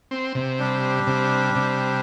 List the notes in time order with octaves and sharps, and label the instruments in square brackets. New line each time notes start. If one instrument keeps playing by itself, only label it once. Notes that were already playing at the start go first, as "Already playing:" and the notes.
[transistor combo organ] C4
C3
[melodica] G3 D4 G4
[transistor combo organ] C3
C3